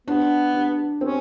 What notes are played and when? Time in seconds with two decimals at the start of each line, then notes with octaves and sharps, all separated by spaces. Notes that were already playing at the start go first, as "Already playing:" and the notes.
0.07 B3 D4
0.54 D4
1.01 C4 C#4